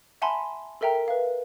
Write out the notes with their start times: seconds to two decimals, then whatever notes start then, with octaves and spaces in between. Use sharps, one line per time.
0.22 E5 F#5 G#5 A5 B5 C6
0.81 A4 A#4 E5 G5 A#5
1.08 B4 F5